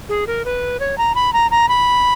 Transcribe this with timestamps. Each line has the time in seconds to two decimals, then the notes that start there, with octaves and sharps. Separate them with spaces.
0.09 G#4
0.27 A#4
0.45 B4
0.80 C#5
0.98 A#5
1.15 B5
1.33 A#5
1.51 A#5
1.68 B5